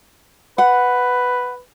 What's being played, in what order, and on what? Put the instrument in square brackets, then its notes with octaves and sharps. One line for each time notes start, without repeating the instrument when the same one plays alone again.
[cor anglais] B4 [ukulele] F#5